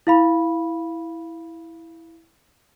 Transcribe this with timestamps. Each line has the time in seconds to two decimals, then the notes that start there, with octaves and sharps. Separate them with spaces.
0.07 E4 F5 B5